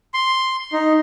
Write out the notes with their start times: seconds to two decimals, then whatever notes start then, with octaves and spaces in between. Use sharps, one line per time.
0.14 C6
0.73 D#4